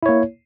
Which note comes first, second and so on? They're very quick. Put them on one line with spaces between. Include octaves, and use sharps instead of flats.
E4 C#5 A#3